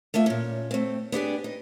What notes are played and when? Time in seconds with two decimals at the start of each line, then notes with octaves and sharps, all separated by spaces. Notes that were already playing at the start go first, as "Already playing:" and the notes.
0.14 A3 A#3 F4 E5
0.26 A#2 C#4
0.71 A3 C4
1.12 B3 D4 G4 G#4
1.44 D#4